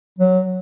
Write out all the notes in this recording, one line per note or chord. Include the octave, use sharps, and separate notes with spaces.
F#3